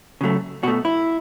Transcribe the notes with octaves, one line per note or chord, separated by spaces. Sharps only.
C#3 F#3 A3
B2 A3 F#4
E4